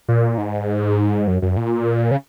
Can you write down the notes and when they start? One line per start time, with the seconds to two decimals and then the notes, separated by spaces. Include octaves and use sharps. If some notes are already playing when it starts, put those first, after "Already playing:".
0.08 A#2
0.38 G#2
1.27 F#2
1.42 F#2
1.57 A#2
2.11 C#3